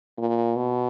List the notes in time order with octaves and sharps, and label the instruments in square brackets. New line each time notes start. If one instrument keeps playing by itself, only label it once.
[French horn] A#2
B2